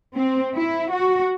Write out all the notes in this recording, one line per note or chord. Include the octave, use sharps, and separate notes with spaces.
C4
E4
F#4